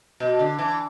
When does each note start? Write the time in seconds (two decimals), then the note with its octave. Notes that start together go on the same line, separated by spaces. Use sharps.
0.20 B2
0.39 D3
0.59 E3